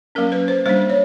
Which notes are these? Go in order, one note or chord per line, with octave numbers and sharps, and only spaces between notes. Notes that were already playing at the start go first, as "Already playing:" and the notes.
F#3 A#3 C#4 A#4
B4
C5
G3 A#3 D4 C5
C#5